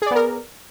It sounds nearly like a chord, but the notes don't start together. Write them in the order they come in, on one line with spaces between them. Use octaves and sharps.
G#4 D5 B3 A#4